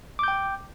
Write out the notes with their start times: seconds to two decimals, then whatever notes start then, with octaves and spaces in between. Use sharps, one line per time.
0.19 D6
0.23 G6
0.28 G5